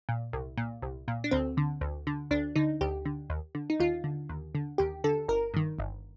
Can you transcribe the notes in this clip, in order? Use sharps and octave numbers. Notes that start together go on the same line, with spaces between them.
A#2
C2
A#2
C2
A#2
D4
D2 C4
D3
D2
D3
D2 D4
D3 D#4
D2 G4
D3
D#2
D3
D#4
D#2 F4
D3
D#2
D3
D#2 G4
D3 A4
G1 A#4
G2 D#3
G1